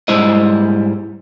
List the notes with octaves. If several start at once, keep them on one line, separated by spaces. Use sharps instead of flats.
G#2 G3 G#3 E4 C5 D#5